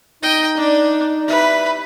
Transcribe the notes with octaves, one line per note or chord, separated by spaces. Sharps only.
D#4 D#5 G5
D4 D5
G3 E4 B4 E5